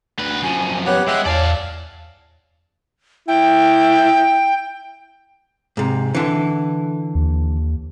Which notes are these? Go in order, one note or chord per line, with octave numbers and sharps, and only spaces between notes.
D2 B4
F#2 F3 G#5
B3 G4 C#5 F#5
G#3 E5 F#5 G5
E2 D5 F5 A5
E4 G5
G#2 C3
D3 E3
D#2